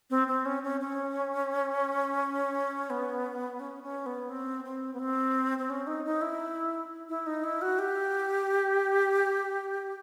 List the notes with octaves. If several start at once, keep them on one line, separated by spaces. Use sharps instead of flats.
C4
C4
C#4
C#4
C#4
B3
C#4
C#4
B3
C4
C4
B3
C4
C4
C#4
D#4
D#4
E4
E4
D#4
E4
F#4
G4